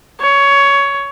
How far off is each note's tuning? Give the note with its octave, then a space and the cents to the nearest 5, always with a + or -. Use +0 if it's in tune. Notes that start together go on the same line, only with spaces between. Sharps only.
C#5 +15